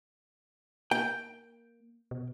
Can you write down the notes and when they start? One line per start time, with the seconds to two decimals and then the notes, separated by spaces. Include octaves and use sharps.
0.91 A#3 G5
2.11 B2